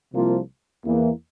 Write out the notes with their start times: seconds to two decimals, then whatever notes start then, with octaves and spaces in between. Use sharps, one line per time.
0.12 C2 C3 F3 A#3 F4
0.85 E2 E3 A#3